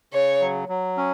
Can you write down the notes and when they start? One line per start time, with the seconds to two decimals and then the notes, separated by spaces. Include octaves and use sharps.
0.13 C#3 C#5
0.41 F#3
0.69 F#3
0.97 C#4